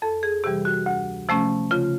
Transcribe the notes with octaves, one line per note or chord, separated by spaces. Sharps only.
F2 A4
G#4
C3 E3 G3 G4
F#4
D2
C3 F3 A3 C#4
C#3 F4